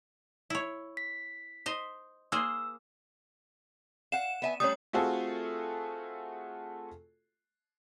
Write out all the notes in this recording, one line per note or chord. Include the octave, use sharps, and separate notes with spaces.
E4 C#5
B6
C5 D#5
A#3 G#4 C5 E6
F5 F#5 E7
B3 E5 G#5
G3 A3 C#4 C#5 D#6
A3 C4 F4 F#4 G#4 A4